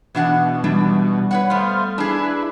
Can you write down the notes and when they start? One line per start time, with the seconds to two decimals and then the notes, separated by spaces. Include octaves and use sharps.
0.15 B2 E3 D4 F#5
0.64 E3 G3 D4
1.31 B4 C#5 F#5
1.50 A3 B3 C5 F5
1.98 D4 E4 G#4 B4